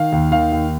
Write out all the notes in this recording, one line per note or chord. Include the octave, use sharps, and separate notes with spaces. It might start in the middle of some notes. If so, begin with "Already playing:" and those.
Already playing: D#3 F5
D#2
D#3 F5
D#2